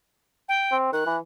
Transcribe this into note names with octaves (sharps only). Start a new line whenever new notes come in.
G5
C4
D#3 F#6
E3